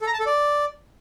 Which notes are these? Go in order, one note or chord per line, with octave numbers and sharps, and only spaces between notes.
A4
A#5
A5
A4
D5